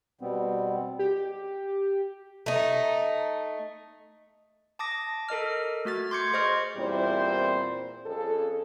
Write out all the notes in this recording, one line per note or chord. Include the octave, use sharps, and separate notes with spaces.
B2 G3 B3 C4
G4
A3 D#4
A5 D6 D#6 A#6
A4 A#4 D#5 F6
A3 F#4 F6 A6
C6 D6 G6 G#6 C#7
G#4 C5 D#5 C#6 F6
E2 A#2 G3 C4 E4 C5
F2 C#4 G#4 A4